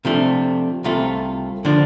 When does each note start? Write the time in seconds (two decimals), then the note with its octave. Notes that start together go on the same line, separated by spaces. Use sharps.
0.05 C3 F3 A3 D4
0.84 C2 C3 A3 F4
1.65 D3 F3 D4